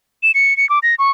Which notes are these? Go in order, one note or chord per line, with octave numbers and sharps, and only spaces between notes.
E7
C#7
C#7
D6
A#6
C#6